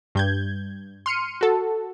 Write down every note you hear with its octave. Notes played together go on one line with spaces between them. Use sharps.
G2 G6 G#6
C6 F6 C#7 D#7
F#4 A4